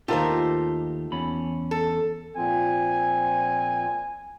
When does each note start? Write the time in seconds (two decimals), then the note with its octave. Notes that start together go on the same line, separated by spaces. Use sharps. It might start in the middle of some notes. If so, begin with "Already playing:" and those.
0.08 D#2 A3 D#4 F4 G4 A#4 C5
1.12 E2 C#4 B5
1.71 A4
2.36 A#2 F3 C4 G#5